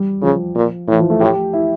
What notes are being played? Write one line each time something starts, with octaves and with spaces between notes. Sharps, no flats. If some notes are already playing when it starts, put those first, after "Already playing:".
Already playing: G3
C#3 F3
A#2
A2 E3
F3
A3
A2 G4
E4